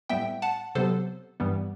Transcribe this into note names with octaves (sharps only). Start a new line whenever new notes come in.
A2 G3 B3 E5 G5
F#5 A5
C3 F#3 B3 A4 C5
G2 E3 G3 B3